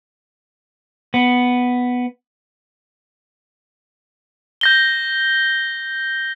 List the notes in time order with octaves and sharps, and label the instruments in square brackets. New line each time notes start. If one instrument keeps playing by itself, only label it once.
[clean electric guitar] B3
[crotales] G6 A#6 G7